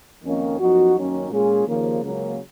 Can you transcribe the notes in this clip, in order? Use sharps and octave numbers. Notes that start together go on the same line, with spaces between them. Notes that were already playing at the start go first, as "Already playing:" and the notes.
F2 D#3 A#3 C#4
F#2 F3 B3 D#4 F#4
F#2 D#3 F#3 A#3 C#4
A#2 G#3 C#4 F4 G#4
D#2 C#3 F3 A#3
C#2 C#3 F#3 A#3